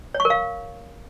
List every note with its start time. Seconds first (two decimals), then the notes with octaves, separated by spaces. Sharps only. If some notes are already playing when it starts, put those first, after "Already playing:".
0.14 C#5
0.20 C#6
0.25 A#4
0.30 F5